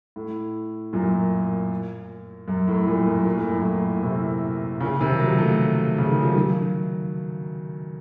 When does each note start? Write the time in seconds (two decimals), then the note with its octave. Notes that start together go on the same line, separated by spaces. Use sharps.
0.16 A2
0.93 F#2 A#2
2.48 F#2
2.67 A2
2.87 F#2 A#2
3.06 F#2
3.25 A#2
3.38 A2
3.50 F#2
3.62 A2
4.03 A2 C3
4.80 A#2 C#3
4.99 C3 D#3
5.13 F3
5.19 D#3 F#3
5.38 F3 A3
5.98 C#3
6.11 D#3
6.23 F3
6.35 D#3 F#3